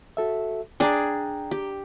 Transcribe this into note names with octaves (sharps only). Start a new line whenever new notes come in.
F#4 A4 E5
D4 G#4 D5 G5 A#5
G4